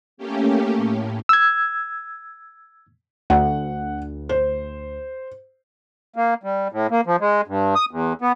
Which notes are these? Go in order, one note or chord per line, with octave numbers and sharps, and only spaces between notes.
A3 A#3 C#4 G4
A2
E6 G#6
D2 F#5
C5
A#3
G3
A2
A#3
F3
G#3
G2
D#6
E2
B3